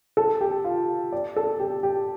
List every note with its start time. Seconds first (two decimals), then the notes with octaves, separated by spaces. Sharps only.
0.17 A4
0.41 G4
0.64 F4
1.12 D5
1.36 A4
1.60 G4
1.83 G4